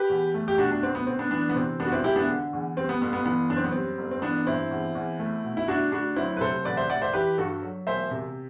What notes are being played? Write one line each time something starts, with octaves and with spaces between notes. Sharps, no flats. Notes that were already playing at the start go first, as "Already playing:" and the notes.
Already playing: G4 B4
E2
A3
G4
B2 D4 F#4
D4
D2 C4
B3
D2 C4
B3 D4
E3 B3 D4
B3
C3 C4
E1 B3 D4
F#4
C4 E4
E1 E4 G4
B3 D4
D3
E2
G3 C4
B3
G1 B3
B3
E3 B3
F#2 D4
C4
B3
G3 C4
G1
C4
E3 B3 D4
G2 C4 E4
E2
E2
A3
B2
E4
D2 D4 F#4
D2 D4 F#4
F#3 C4 E4
B4
C3 A4 C5
A1 B4 D5
C5 E5
A1 D5 F#5
C5 E5
E3 G4 B4
G2 F#4 A4
F#3
E1 C5 E5
C3